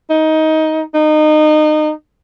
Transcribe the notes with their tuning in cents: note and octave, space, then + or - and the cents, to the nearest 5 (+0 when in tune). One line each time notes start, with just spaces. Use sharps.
D#4 +15
D#4 -25